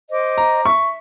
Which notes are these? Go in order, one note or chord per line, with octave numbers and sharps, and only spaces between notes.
C5 D#5 D6
A#5
E5 C#6